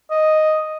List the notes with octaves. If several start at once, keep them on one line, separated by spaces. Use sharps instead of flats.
D#5